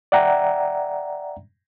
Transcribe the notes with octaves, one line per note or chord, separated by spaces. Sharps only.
D5 E5 F#5 G5 A#5